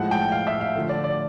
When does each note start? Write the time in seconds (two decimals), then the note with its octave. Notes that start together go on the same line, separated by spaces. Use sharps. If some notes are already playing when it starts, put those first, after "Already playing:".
Already playing: A2 F3 G#3 F#5
0.11 G5
0.32 F5
0.47 E5
0.61 F5
0.75 D3 F3 A3
0.89 D5
1.04 D5